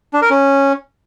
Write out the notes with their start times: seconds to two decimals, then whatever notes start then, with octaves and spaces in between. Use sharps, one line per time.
0.13 D4
0.22 A#4
0.30 C#4